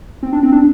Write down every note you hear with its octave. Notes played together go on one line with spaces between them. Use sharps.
C4
D4
C4
D4